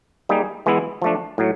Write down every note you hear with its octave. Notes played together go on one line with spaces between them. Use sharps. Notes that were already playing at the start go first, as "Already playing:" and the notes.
G3 A#3 D#4 G#4
E3 G#3 B3 E4
F3 A3 D4
A2 F#3